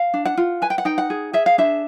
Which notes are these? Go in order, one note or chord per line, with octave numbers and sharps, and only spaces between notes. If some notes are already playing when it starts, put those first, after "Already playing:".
Already playing: F5
D4
F#5
F4
B4 G#5
G5
F#5
D#4 G5
F#5
G#4
G#4 E5
F5
D4 E5